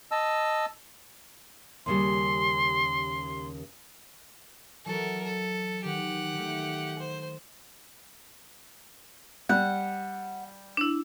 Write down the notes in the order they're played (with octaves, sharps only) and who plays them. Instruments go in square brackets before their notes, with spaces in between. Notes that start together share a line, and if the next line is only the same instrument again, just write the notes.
[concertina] D#5 A5 E6
[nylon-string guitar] D#2 C#3 G3 [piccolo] C6
[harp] E3 F#3 F#4 [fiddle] A4 A#4
[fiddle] A4
[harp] D#3 [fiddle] G4 F#5
[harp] D#3 A3
[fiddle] C5
[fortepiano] G3 [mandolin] F#5
[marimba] D4 E4